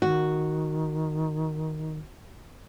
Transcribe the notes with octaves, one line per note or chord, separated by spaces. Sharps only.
D#3 F#4